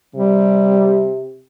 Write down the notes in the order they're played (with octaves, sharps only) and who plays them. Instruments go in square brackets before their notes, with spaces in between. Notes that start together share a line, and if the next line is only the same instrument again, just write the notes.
[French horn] C3 [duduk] G3